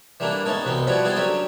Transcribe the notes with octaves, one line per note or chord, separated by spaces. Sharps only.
E3 G3 A3 A#3 D4 E4
A3 B3 C#4 D#4 A4
C2 B2 E3 B3 C4
F3 G3 E4 F#4 C#5 D5
B3 C4 E4 G#4 A4
D3 F#3 A3 C#4 G4